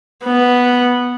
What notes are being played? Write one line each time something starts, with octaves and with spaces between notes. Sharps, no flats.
B3